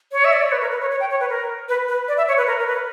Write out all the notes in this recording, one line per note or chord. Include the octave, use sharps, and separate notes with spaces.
C#5
E5
D5
C#5
B4
A#4
B4
C#5
C#5
G5
C#5
B4
A#4
B4
B4
D5
E5
C#5
B4
A#4
A#4
B4